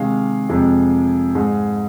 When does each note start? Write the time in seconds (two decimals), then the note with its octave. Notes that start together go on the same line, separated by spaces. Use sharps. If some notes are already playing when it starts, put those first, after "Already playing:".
Already playing: C3 D#3 G#3 F5
0.49 F2 C3 F3 G#3
1.35 G#2 G#3